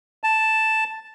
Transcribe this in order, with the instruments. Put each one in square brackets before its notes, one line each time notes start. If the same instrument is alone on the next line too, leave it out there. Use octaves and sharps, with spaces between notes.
[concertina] A5